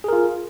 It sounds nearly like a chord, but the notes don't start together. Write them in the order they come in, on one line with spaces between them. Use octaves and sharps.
G#4 A#4 F4